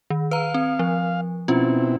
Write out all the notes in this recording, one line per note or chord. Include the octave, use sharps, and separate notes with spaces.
D#3
B4 F5 A#5
C4
F3
B2 C4 C#4 E4 F4